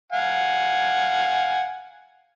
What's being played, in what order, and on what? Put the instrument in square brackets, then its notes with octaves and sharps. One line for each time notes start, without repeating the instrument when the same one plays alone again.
[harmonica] F5 F#5 G#5